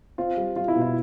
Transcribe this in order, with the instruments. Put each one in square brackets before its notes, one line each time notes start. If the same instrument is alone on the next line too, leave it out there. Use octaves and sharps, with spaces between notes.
[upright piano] C4 [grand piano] F4
[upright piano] G3
[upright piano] G3 [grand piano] F4
[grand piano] E4
[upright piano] B2
[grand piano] E4